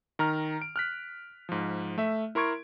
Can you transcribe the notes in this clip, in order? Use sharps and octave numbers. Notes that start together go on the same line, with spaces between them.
D#3 A#5 F6
D7
F6 F#6 B6
G#2 F3
A3 E5
E4 A#4 C6 C#6 G#6 D7